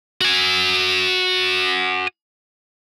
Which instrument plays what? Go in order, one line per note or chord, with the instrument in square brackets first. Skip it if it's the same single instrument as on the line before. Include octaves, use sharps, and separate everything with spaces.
[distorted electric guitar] F#4 G#5